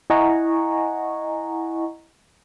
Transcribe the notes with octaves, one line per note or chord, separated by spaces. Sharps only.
E4 D#5 F#5 G#5 A#5 C#6